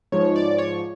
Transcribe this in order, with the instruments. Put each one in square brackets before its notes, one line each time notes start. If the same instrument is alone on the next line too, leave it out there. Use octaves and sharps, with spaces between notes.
[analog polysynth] G#2 F3 C#5
D5
C#5